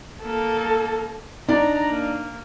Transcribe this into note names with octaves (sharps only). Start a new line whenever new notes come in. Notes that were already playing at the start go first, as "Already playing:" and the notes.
A#3 A4
D4 D#4 D5 A#5
A#3